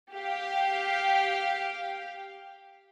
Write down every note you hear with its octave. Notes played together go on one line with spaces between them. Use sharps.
G4 F5